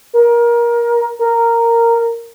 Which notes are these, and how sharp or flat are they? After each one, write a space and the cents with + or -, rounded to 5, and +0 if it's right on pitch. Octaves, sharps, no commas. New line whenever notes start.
A#4 +20
A#4 -10